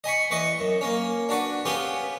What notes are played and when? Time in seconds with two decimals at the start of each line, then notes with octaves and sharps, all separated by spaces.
0.04 D#5 G#5 B5 C#6
0.31 E2 B4 D#5 C#6
0.59 F#2
0.81 A#3 C#4
1.29 D4 F#4 B4
1.65 B3 C#4 F4 G4 G#4 B4